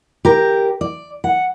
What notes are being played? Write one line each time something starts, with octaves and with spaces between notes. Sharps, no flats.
G4 A#4
D5
F#5